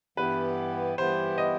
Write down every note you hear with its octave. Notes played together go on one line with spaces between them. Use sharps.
G2 E3 B3 E4 G4 B4
G2 E3 B3 E4 G4 C5
D#5